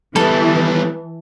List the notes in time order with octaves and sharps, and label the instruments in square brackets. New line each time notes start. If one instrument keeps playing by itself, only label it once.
[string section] E3 [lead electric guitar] G3 B3 [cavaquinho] A4